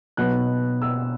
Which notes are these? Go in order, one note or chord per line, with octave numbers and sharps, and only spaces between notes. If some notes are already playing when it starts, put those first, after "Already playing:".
B2 F#3 B3 D#4 F#6
E6